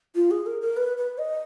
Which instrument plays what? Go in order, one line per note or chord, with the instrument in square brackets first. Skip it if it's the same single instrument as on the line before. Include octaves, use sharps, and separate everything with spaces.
[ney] F4
G#4
A#4
A#4
B4
B4
D#5